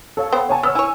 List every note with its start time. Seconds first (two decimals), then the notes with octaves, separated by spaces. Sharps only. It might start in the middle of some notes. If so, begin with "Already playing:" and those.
0.17 A4 C#5 F5
0.33 B3 C5 G5
0.49 C#5 G#5 A5
0.63 B3 C#5 E6 F6
0.75 E4 C#5 G#5